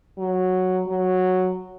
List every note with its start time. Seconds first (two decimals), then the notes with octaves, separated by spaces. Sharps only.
0.18 F#3
0.87 F#3